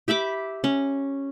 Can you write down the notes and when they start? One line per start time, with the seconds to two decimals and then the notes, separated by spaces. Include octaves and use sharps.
0.08 G4 E5 B5 D6
0.64 C#4